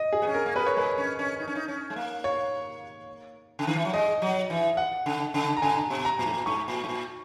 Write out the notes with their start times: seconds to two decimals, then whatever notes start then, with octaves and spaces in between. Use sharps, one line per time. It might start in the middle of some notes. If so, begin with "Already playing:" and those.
Already playing: D#5
0.13 G#4
0.22 B3
0.27 C#4
0.34 A#4
0.46 A#3
0.55 B3 B4
0.67 C#5
0.77 G#3 B4
0.98 C#4
1.19 C#4
1.40 D#4
1.48 C#4
1.55 D#4
1.68 C#4
1.90 G#3
1.96 A#3
2.24 C#5
3.59 C#3
3.67 D#3
3.76 E3
3.85 F#3
3.93 G#3 D#5
4.22 F#3
4.50 E3
4.77 F#5
5.06 C#3
5.34 C#3
5.57 A#5
5.62 C#3 G#5
5.90 B2
6.05 A#5
6.19 A#2
6.26 G#2
6.33 A#2
6.46 G#2 C#6
6.68 A#2
6.84 G#2
6.89 A#2